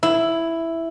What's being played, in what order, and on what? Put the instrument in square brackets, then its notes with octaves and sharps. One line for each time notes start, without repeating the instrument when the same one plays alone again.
[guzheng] E4